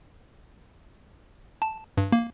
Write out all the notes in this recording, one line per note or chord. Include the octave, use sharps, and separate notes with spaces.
A5
G2
A#3